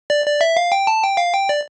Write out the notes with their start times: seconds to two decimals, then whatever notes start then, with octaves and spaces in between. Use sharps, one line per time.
0.10 D5
0.26 D5
0.41 E5
0.57 F5
0.72 G5
0.87 A5
1.03 G5
1.17 F5
1.33 G5
1.49 D5